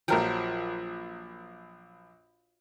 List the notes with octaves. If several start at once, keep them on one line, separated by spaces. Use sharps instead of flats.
A#1 F3 F#3 A#4 G5